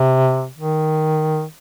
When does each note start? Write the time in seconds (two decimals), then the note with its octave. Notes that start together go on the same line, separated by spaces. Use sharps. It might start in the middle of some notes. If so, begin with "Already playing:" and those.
Already playing: C3
0.58 D#3